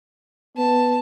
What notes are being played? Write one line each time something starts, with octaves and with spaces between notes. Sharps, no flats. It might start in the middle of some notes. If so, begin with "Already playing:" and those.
B3 A5